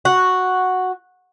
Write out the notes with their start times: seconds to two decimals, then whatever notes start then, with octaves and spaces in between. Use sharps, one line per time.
0.05 F#4